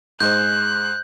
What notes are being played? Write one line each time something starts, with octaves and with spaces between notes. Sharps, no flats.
G#2 G#3 C5 F#6 G6